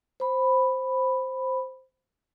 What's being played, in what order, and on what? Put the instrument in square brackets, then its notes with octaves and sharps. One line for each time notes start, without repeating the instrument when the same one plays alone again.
[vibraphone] C5 B5